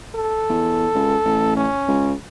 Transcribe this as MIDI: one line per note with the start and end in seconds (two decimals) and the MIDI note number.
0.15 1.54 69
0.49 0.87 40
0.95 1.16 37
1.25 1.67 33
1.57 2.14 61
1.88 2.13 37